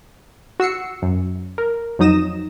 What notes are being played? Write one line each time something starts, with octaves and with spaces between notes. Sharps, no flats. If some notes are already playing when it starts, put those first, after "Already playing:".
F#4 E6 C7 C#7
F#2
A#4
F2 F#3 D#4 D#6 A#6 E7